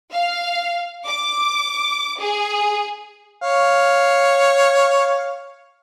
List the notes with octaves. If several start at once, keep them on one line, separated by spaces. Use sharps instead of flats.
F5
D6
G#4
C#5 F5